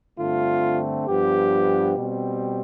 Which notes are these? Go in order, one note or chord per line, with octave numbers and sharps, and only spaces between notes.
G2 D3 A3 C4 F4
G2 F3 B3 G4
B2 G3 C4